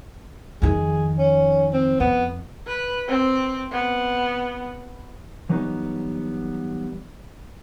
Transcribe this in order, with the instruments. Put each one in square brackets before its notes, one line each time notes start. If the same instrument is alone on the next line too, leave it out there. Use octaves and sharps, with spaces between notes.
[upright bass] F2 D#3 [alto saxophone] G#4
[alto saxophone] C#4
C4
[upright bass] F2 [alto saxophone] B3
[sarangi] B4
C4
B3
[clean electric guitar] E3 F#3 G3 B3 D#4